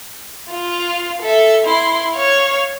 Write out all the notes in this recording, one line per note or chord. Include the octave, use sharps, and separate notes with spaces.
F4
A4 E5
E4 C6
C#5 F5